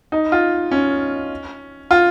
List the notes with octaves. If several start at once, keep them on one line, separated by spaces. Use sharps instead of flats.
D#4
F4
C#4
F4